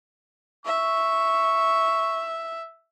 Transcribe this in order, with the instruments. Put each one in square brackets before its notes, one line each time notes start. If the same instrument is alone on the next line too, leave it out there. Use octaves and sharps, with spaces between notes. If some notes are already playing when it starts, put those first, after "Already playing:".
[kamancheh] E5 [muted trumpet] C#6